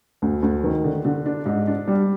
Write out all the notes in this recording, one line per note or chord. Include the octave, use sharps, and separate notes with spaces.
D2
D2
D#3
D3
D3
D4
G#2
D4
G3